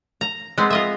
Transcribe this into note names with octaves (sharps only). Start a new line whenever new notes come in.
A#5
G#3 B3 C4
F4 D#5 E5